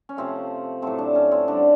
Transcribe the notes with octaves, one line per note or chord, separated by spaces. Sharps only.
C#4
C3 F3 A3 C4
A2 F#3 A3 C4
D4
C#4
C4
D3 G3 D4